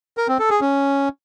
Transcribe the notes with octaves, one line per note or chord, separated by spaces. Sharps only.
A#4
C4
A4
G#4
C#4